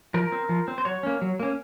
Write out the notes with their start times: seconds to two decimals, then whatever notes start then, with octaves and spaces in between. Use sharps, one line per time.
0.14 F3 A#4
0.32 C4
0.49 F3
0.68 C4
0.78 C5
0.85 F#3 C#5
1.03 A#3 C#4
1.22 F#3
1.40 A#3 C#4